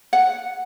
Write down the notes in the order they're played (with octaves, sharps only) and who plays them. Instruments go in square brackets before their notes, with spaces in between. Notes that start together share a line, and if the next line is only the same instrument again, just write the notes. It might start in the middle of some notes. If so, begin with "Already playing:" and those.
[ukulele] F#5